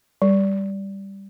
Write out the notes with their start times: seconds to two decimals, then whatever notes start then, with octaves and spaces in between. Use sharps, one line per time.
0.22 G3